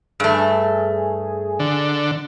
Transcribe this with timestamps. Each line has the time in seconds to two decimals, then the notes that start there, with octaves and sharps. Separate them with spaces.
0.20 G2 A3 G#4
1.59 D3